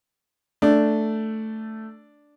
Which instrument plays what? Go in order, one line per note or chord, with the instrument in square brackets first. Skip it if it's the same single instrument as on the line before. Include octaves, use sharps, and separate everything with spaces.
[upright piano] A3 [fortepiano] D4